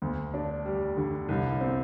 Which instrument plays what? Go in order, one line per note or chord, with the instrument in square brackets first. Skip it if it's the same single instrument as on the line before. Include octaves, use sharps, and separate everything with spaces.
[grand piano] D2
D4
G3
D3
C2
C4